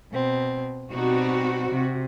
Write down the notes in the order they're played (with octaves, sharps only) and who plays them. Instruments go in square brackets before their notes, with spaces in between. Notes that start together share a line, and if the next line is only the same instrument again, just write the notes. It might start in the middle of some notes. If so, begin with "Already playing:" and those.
[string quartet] B2 C4
[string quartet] B2 G3 D#4 [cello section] C4 F#4
[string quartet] C3